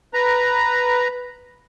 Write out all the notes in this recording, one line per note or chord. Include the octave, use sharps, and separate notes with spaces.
B4 A#5